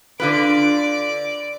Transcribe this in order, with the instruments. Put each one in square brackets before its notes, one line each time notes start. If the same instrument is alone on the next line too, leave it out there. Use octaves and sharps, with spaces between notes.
[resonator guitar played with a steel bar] D3 F4 B4 [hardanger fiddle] D5 D6